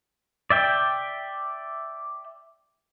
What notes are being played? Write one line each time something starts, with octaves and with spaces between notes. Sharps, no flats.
D5 E5 G5